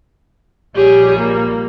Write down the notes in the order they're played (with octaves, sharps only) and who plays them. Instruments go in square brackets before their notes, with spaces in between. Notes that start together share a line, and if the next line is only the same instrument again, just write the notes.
[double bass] A#1 G3 [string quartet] G4 G#4 C#5
[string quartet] A#3